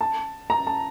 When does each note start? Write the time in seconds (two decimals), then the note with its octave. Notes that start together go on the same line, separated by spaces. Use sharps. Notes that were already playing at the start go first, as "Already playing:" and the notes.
0.01 A5
0.50 A#5
0.67 A5